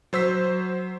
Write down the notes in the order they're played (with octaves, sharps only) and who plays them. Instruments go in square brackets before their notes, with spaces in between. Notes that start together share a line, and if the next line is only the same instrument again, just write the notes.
[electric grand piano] F#3 C5 E6 B6